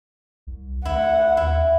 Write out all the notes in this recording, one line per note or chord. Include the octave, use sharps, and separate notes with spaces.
C2
D2 E4 F#5
D#2 E4